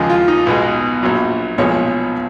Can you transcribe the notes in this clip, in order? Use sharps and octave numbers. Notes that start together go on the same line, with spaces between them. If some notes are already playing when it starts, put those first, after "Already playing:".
Already playing: D#2 C#3 F3 G#3
F4
D#4
B1 B2 G#3
A#1 A#2 F#3
B1 A#2 F3 G#3 C#5